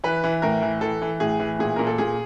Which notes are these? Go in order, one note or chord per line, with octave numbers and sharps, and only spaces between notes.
E3 B4
E3
A2 A#4
E3
E3 A4
E3
A2 G#4
E3
A#2 G#4
A#2 A#4
A4
A#2 G#4